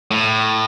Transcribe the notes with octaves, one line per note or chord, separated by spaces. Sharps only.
A2